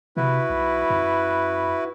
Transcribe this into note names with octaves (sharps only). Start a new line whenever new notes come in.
C3 E4 F#4 B4
B1
F#2